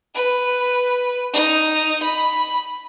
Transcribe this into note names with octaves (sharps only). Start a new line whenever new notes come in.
B4
D#4
B5